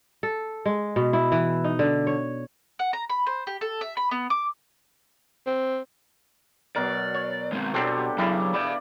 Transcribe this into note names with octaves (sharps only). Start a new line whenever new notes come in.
A4
G#3
B2
E4
E3
D#4
D3
C#5
F#5
A#5
B5
C5
G4
A4
E5
B5
B3
D6
C4
B2 F#3 A#4 D5
C#5
G#3 C4
B2 F#3 G3 C4 D4 G4 A4
C#3 F#3 G3 A#3 E4 D5
D5 F5 B5